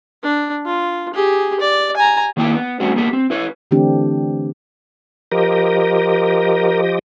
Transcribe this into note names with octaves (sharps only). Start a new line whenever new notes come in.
D4
F4
G4 G#4
D5
G#5 A#5
D#3 A#3 E4 G5
B3
G3 A3 C4 C#4 F#4
A#3 B3 G4
C4
E4 B4 C#5
D3 E3 A3 C4 D4 G4
F3 G4 A#4 D#5